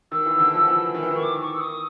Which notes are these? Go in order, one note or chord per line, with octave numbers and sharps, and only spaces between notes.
D#3 E6
E3
D3
F3
E3
D#3
E3
D#3
C#6
D6
C#6
E6
D#6